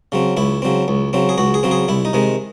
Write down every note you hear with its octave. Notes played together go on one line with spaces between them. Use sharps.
C#3 F#3 C4
C#2 E4
C#3 F#3 C4
C#2
C#3 F#3 C4
G#4
C#2 F#4
G#4
C#3 F#3 C4
G#4
C2 E4
D#4
C3 D#3 G#3